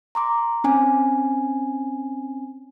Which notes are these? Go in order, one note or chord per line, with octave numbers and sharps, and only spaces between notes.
A#5 C6 D6
C4 C#4 G#5